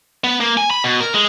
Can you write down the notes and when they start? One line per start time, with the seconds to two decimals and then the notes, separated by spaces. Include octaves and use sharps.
0.24 B3
0.40 A#3
0.57 G#5
0.70 B5
0.84 B2
1.00 A#4
1.14 G#3